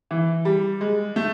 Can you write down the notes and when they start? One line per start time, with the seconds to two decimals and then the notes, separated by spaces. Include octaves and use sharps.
0.11 E3
0.45 G3
0.81 G#3
1.16 A3